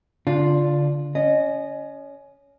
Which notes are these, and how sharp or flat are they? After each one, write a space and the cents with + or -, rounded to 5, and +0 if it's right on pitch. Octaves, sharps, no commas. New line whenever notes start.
D3 -35 D4 +0 F4 +0
C#4 +20 D#5 -20